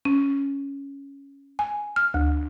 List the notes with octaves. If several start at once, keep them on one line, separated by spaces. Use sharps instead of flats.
C#4
G#5
F6
D2